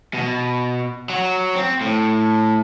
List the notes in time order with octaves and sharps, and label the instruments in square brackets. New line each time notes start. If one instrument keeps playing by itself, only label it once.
[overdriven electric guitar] B2
F#3
C4
A2